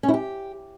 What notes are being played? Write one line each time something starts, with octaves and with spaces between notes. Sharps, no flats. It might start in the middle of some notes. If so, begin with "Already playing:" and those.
C#4
E4
G4